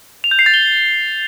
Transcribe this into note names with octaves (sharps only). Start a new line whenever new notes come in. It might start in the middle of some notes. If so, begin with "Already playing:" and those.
F7
G6
C7
A6
G7